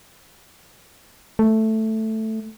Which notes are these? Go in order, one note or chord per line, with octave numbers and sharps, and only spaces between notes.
A3